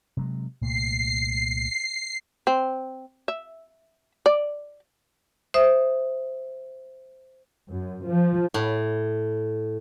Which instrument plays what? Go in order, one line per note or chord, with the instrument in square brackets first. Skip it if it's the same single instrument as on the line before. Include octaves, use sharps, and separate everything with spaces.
[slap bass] C3 F#3 G#3
[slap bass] C2 A#2 A3 [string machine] C7
[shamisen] C4
E5
D5
[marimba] C5 E5 D#6
[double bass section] F#2
F3
[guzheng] A2